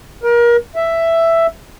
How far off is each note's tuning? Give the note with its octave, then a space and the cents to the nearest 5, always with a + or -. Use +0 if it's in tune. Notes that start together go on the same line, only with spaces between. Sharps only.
A#4 +30
E5 +5